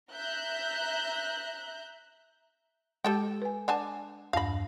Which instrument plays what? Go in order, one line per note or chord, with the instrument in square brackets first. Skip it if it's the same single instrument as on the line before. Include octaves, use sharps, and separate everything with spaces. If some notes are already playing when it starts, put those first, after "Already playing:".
[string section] E5 A#5 F#6 G6
[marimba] G#3 [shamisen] G4 A4 G5
[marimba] B4 G#5
[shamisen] D4 G#5 A5 [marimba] F#5
[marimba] E2 G2 A#6 [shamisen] F5 B5